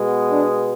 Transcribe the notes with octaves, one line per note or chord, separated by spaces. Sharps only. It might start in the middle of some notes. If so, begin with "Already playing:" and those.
Already playing: B2 G#3 B3
D4